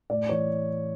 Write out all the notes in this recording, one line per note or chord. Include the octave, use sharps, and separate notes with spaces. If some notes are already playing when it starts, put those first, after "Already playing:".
A2 D5
E3 C#5